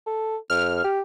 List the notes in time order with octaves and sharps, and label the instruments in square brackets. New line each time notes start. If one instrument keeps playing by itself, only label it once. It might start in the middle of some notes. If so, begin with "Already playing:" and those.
[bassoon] A4
[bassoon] F2 [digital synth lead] F6
[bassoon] G4